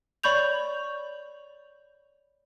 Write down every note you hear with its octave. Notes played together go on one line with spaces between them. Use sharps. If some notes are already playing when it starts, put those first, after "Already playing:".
C#5 D5 B5 C#6 G6 F7